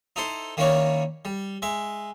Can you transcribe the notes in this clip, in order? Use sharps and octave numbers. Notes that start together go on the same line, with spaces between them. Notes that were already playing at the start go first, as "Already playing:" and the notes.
D#4 E4 A4 C5
D#3 A#3 C#4 E4 C#5 D5
G3
G#3 E5